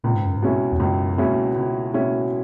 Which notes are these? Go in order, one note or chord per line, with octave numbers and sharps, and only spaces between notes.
C#2 A#2
G#2
F#2
G#2
B2 G#3 C#4 E4
E2
C#2 F#2
B2 G#3 C#4 E4
C#2
B2 G#3 C#4 E4